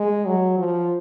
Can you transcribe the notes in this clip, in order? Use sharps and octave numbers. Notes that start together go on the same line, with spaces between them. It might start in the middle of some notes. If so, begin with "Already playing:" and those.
Already playing: G#3
F#3
F3